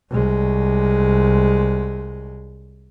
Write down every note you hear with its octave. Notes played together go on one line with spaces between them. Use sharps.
C2 G#3